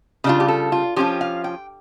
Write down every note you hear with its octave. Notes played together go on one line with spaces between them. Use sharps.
C#3 G3 D4 F4
G4
A4
F4
F3 C#4 F4 G4
F5
G5